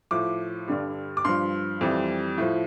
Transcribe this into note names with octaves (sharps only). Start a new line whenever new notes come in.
A2 F3 D6
G2 D3 G3
D6
G2 F3 C6
F2 E3 G3
A2 F3